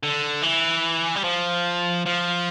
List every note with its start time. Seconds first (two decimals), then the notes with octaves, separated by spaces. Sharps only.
0.03 D3
0.43 E3
1.16 G3
1.24 F3
2.06 F3